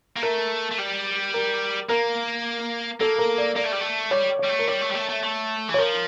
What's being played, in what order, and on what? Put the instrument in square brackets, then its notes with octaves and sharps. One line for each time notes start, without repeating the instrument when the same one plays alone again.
[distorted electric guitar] A#3
[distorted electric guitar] A3 [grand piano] A#4
[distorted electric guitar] A3
G3
[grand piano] A#4
[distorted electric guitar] A#3 [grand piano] A#4
[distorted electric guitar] A#3 [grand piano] A4
[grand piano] A#4
D5
[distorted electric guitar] A#3 [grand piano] D5
[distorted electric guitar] A3
G3
A3
[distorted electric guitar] G3 [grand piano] C#5
[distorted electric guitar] G3 [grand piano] C#5
[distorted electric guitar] A3
[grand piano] A#4
[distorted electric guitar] G3 [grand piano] C#5
[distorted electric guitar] A3
G3
A3
A3
A3
E3
[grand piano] C#5
[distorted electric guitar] F3 [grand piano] A#4